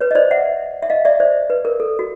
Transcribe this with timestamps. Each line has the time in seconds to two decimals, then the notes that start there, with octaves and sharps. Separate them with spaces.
0.01 B4 C#5
0.11 D#5
0.15 C5 D5
0.31 E5 F#5
0.82 E5
0.90 D#5 F5
1.05 D5 E5
1.20 C5 D5
1.50 B4
1.65 A#4
1.80 A4
1.99 F#4